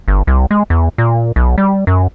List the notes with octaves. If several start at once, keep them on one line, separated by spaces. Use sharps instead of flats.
G1
C2
G#3
E2
A#2
B1
G3
F#2